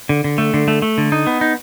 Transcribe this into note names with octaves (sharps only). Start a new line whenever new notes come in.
D3
D3
A3
D3
A3
A3
D3
D#4
B3
D#4